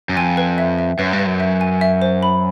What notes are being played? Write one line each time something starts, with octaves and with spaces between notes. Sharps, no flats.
F#2
F2 G#5
B4
E5
E5
F#2 B4
G2
B4
F#2
E5
G#5
E5
C5
B5